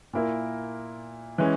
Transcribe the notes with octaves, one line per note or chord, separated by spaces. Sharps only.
A#2 A#3 E4 A#4
E3 G#3 C#4